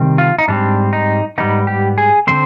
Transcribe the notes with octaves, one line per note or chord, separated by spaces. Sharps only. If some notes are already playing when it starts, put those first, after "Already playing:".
Already playing: C3 D#3 G3 C4
F4
D#4
G#2 G3 C4 D4
D#4
G#2 G3 B3 D#4
G4
G#4
D3 G#3 C4 C5